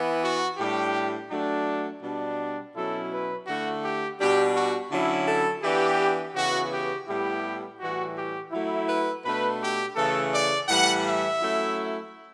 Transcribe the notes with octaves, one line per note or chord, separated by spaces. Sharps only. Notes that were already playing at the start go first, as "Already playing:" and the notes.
Already playing: E3 B3 E4
F#4
A2 G3 D4 G4
F#3 A3 D4
B2 G3 D4
B2 F#3 C#4 E4 A4
B4
D3 A3 E4 F#4
G4
B2 G3 D4 G4
F#4
D3 F#3 C#4 E4
A4
E3 B3 D4 G4
C#3 E3 B3 F#4
G4
A2 G3 B3 E4 G4
A2 E3 G3 F#4
G4
F#3 A3 E4
B4
B2 A3 D4 B4
G4
C#3 E3 A3 A4
D5
A2 E3 G3 F#5
E5
F#3 A3 C#4 E4